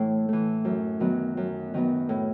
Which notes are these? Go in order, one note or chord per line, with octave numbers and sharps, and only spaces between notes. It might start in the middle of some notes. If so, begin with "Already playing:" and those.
Already playing: A2 E3 A3
E3 A3
F#2
D#3 F#3 B3
F#2
D#3 F#3 B3
A2